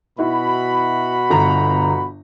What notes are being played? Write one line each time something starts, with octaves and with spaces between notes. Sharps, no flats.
B2 E4 F#4 B5
G1 A#5